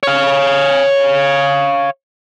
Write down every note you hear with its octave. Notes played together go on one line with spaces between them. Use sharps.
C#5 F5